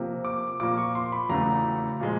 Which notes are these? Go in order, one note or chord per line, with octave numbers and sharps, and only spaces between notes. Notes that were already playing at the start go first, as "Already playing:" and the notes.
Already playing: C3 F3 A#3
D6
A#2 F3 A#3 D6
C#6
C6
B5
E2 C#3 F#3 A3 A#5
A#2 F3 G#3